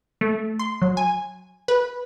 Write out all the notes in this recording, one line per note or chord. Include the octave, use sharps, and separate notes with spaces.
A3
C6
F#3
G#5
B4